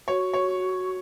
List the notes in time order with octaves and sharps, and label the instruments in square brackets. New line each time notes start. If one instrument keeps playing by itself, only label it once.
[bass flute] F#4 [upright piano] C#5
[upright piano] C#5